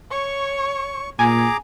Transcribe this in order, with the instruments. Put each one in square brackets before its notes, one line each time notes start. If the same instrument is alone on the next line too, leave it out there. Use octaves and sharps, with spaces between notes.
[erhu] C#5 [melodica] C#6
[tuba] A#2 [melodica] G#4 A#5 D6 [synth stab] G#5